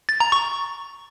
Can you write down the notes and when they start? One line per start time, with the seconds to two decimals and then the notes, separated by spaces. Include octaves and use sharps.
0.09 A6
0.20 A#5
0.32 C#6